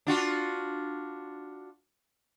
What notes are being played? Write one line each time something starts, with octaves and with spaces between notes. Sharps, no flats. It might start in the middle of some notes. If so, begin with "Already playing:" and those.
D4 F4 F#4